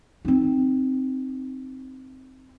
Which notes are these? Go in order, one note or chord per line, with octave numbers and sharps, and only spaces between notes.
C4 D#4